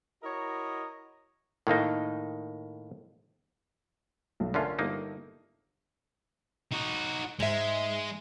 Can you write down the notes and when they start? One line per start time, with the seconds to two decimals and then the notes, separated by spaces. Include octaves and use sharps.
0.23 E4 F#4 A#4 C#5 D#5 A#5
1.67 A2 D#3 A#3 D#4
4.40 B1 A3
4.54 D3 C#4 F4 A4 A#4 E5
4.79 G1 A#3 D#4
6.72 D#4 F#4
7.40 G#2 G#3 E5